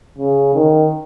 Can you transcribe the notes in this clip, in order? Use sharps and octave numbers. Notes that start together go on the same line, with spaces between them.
C#3
D#3